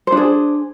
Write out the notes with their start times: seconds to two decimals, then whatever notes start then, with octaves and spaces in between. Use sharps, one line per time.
0.07 C5
0.12 D4
0.17 G#4